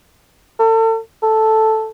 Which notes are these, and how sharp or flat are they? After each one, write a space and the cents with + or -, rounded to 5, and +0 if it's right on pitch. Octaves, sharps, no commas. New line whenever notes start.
A4 +35
A4 +0